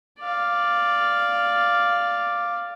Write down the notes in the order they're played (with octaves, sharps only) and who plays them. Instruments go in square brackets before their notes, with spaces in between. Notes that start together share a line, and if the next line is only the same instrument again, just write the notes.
[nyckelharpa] D5 F5